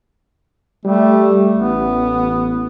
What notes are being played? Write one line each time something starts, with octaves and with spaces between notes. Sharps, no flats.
G3 A3
A1 B3